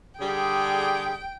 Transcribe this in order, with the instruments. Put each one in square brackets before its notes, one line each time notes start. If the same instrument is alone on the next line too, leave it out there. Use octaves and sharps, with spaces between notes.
[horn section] D3 G3 G#4 [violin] G5